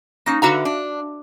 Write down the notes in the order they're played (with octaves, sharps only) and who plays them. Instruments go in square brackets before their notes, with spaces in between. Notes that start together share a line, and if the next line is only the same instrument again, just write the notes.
[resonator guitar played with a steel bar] A#3 C#4 [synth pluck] D#4 A#6
[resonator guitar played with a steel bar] D3 B4 A#5 [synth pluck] F#4 E5 F5
[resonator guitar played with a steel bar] D4